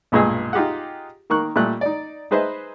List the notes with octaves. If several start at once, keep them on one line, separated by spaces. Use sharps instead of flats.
B1 G2 A#2 G#3 G#4 E6
D#4 F4 G4 G#4 F#5
D#3 A#3 C#6 F#6
A#2 G3 A3 F#6
D#4 D5
D#4 G#4 B4 C5 D#5 E5